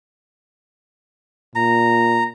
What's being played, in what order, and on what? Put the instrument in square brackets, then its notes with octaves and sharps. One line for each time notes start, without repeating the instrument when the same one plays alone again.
[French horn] A#2 [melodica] A#5